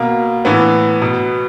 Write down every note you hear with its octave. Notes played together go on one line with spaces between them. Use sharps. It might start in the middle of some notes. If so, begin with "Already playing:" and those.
Already playing: B2 A#3
A2 E3 B3
B2